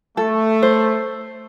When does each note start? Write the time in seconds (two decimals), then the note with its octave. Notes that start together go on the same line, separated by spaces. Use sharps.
0.17 A3 A4
0.63 C5